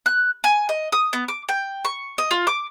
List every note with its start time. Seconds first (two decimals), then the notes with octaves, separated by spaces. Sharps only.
0.06 F#6
0.44 G#5
0.69 D#5
0.92 D#6
1.13 B3
1.28 D6
1.49 G5
1.85 C#6
2.18 D#5
2.31 F4
2.47 D6